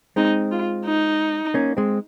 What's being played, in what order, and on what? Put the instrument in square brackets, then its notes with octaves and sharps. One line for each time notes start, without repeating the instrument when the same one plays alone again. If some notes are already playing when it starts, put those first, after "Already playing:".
[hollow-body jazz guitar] G#3 C4 [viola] D#4
[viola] F4
D#4
[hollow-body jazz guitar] A#3 C#4
G#3 C4